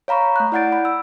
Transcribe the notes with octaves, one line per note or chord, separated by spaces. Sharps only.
C#5 F5 A#5 B5 C#6
A3 F#6
E4 D5 F#5 G6 A6 D7
B5
E6